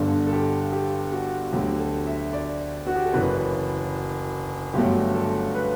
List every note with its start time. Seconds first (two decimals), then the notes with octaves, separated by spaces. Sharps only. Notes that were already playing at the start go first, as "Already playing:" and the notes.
Already playing: G1 G2 D3 A4
0.26 A4
0.32 G4
0.73 G4
1.12 F#4
1.53 D2 D3 F#3 A3 G4
1.79 A4
2.06 E5
2.33 D5
2.87 F#4
2.96 G4
3.05 A4
3.14 F#1 F#2 E3 B4
4.74 G1 G2 F#3 A3 G4
5.14 A4
5.55 B4